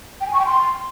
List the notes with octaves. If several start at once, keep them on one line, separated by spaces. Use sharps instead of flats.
G5
G#5
C#6
G5
C6